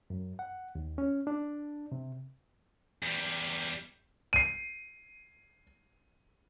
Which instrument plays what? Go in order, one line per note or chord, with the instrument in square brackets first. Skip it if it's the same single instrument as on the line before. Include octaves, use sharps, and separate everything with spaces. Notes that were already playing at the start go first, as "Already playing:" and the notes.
[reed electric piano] F#2
F#5
D#2
C#4
D4
C3
[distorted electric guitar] E2 G3
[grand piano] C7 D#7